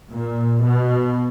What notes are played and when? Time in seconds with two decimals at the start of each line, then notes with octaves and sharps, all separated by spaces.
0.10 A#2
0.64 B2